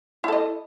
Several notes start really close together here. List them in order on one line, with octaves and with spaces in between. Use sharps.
E4 A4 D#5